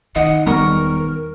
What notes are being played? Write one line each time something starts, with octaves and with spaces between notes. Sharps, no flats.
D#3 D#5 F#5
E1 G3 B3 A#4 A#5 C#6